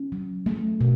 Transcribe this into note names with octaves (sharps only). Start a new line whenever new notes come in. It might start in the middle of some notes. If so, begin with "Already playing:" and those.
Already playing: C#4
F#3
A3
B2